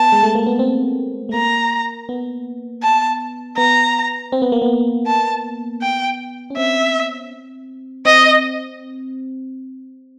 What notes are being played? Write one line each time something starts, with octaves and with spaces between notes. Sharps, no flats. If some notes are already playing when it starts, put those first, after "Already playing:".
Already playing: B3 A5
G#3
A3
A#3
B3
C4
A3
A#3 A#5
B3
A5
B3 A#5
C4
B3
A#3
B3
A5
G5
C#4
C4 E5
C4 D#5